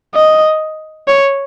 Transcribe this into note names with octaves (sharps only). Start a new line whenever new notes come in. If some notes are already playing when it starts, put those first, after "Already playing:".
D#5
C#5